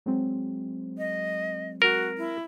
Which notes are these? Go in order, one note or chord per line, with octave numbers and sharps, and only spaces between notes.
F#3 G#3 C4
D#5
F#4 A#4
E4